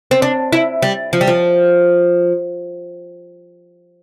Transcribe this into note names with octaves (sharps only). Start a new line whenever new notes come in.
C4
D4
E4
G3
F3
G3
F3